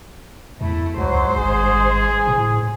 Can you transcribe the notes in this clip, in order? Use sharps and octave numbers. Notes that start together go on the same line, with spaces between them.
E2 A3 E4
C#2 G#2 F#3 C5
G#1 G#4
A2